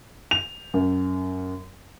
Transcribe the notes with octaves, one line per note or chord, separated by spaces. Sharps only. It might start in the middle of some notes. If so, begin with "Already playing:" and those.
F7
F#2